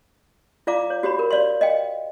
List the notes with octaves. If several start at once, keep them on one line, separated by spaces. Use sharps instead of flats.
F4 D5 F5 A#5 D6
C#5
F#4 G4 C#5 B5
A#4
C#5 D5 F5 C6
D#5 F5 G5